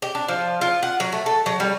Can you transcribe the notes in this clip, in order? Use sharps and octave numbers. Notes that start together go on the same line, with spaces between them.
G4
D4
F3
F4
F#5
F#3
A3
A4
F#3
G3